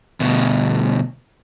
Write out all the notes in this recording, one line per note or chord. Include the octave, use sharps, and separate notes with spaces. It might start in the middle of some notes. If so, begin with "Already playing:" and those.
D2 B2